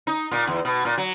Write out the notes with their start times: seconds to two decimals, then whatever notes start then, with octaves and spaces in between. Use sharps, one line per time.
0.07 D#4
0.31 A#2
0.47 E2
0.65 B2
0.85 A#2
0.97 F#3